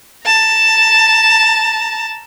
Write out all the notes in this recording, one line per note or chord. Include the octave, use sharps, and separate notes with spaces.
A5 A#5